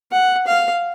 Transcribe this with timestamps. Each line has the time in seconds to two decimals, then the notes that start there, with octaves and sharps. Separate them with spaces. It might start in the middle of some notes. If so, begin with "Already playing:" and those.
0.12 F#5
0.47 F5